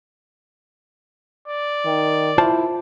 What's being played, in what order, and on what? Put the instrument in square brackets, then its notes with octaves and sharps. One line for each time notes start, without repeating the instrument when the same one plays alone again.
[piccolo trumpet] D5
[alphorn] D#3
[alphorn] E4 [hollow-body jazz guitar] F4 C5 A5